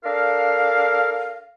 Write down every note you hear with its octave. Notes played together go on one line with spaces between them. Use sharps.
D4 A4 A#4 F5